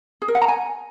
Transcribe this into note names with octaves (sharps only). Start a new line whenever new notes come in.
G#4
A#4
F#5
A#5
G#5